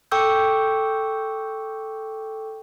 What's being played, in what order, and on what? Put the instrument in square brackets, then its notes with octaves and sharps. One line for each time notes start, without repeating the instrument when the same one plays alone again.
[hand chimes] A4 G5 C#6 D6 E6 G6